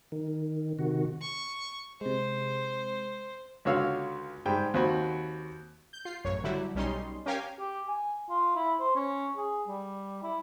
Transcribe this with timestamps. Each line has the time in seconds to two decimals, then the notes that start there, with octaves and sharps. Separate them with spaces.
0.12 D#3
0.79 C3 D#3 F#4
1.22 C#6
2.01 C3 G#3 C5
3.65 C#2 D3 F#4 C#5 F5 E6
4.46 G#2 G3 G5
4.74 D#2 C4 F#4 B5
5.93 G6
6.05 F4 C7
6.24 A1 F#2 C#5
6.44 D3 F#3 G3 E4
6.75 B1 G3 C#4 D#4 C6
7.26 C#4 G4 A#4 F5 G5 G#5
7.59 G4
7.88 G#5
8.30 F4
8.56 E4
8.80 C5
8.95 C#4
9.37 G#4
9.68 G3
10.23 E4